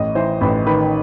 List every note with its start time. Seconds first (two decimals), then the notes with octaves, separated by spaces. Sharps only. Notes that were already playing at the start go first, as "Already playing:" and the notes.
Already playing: A1 D#5
0.15 E3 C5
0.41 A1 B4
0.66 D#3 B4